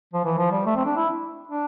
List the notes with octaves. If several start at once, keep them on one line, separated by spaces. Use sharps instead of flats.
F3
E3
F3
G3
A3
C4
D4
E4
D4